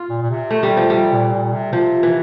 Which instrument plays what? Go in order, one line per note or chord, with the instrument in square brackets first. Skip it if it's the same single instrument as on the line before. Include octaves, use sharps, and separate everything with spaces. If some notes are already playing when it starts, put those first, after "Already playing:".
Already playing: [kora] F4
[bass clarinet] A#2
A#2
C3
[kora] A3
G3
F3
G3
[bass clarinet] A#2
A#2
C3
[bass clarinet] C3 [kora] F3
[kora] E3